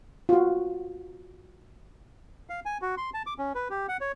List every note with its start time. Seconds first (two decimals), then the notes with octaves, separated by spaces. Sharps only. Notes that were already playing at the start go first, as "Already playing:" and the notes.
0.29 F4 F#4
2.49 F5
2.65 G#5
2.82 F#4
2.97 C6
3.14 A5
3.26 D6
3.38 C#4
3.55 B4
3.70 G4
3.89 F#5
4.01 C#5